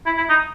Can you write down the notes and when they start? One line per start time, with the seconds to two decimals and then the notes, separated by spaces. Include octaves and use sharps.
0.06 E4
0.17 E4
0.29 D#4